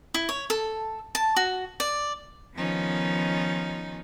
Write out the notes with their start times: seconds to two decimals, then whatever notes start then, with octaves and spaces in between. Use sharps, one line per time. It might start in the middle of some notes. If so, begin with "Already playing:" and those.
0.14 E4
0.29 C#5
0.50 A4
1.15 A5
1.36 F#4
1.80 D5
2.55 D#3 F3 B3 C#4 D#4 F4